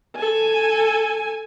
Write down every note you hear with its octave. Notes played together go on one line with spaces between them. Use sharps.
A4 G#5